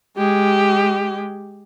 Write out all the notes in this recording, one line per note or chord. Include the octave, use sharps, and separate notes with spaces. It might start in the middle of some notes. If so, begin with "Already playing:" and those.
G#3 G4